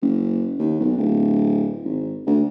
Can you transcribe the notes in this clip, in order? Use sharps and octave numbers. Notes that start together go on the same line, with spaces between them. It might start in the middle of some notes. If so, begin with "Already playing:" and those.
F#1
D#2
B1
D1
G#1
D2